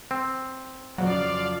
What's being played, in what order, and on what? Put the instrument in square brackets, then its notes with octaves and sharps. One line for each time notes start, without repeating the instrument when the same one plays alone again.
[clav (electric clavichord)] C4
[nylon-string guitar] F2 C#3 F3 [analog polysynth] F#3 [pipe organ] D5 F5